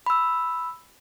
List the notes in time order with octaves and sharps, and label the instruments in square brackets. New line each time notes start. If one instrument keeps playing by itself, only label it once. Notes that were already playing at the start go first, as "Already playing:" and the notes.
[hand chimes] B5 E6